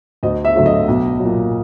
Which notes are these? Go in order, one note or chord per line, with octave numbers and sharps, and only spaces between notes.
D2 D#5
E5
D3 F#3 A3
D#5
B1
A#2 F#3